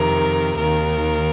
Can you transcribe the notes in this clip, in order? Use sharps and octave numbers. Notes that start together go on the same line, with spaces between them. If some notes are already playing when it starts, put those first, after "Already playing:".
Already playing: F2 C3 D#3 A#4
D#2 D#3 A#4